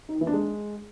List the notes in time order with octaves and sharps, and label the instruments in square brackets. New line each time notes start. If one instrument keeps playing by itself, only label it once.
[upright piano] D#4
D#3
E3
D4
G#3